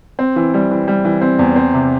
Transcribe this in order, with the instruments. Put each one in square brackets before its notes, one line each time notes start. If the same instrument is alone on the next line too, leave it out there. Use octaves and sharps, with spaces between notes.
[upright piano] C4
E3
G3
E3
G3
E3
C4
E2
C4
C3